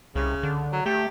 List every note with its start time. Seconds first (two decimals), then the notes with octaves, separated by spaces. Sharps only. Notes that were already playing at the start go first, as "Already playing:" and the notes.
0.16 C2 C#3
0.43 D3
0.73 F#3
0.86 A3 G4